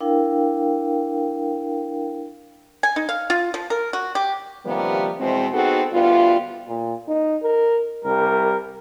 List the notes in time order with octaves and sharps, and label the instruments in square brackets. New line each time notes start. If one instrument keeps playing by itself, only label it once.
[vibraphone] D4 E4 A#4 F5 G5
[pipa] G#5
D#4
F5
F4
F3
A#4
F#4
G4
[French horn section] C3 D#3 F3 G3 A#3 B3
E2 B2 G#3 C4
B3 C4 D#4 F#4 G#4 A4
D2 G3 B3 F4
[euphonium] A#2
D#4
A#4
[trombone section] C2 G3 A#4